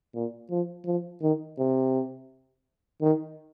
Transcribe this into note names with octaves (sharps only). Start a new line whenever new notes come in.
A#2
F3
F3
D#3
C3
D#3